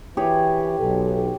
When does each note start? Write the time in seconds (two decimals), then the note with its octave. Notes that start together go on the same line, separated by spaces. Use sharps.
0.17 E3 G4 G#4 C#5
0.79 B1 A4